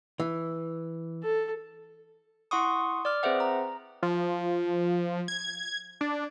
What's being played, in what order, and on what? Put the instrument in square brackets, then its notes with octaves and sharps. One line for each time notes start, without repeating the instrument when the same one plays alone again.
[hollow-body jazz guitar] E3
[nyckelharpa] A4
[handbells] E4 F#5 C6 C#6 D#6
D5 D6 F6
C4 G#4 B4 C5 E5 F#5
A#5
[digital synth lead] F3
G#6
D4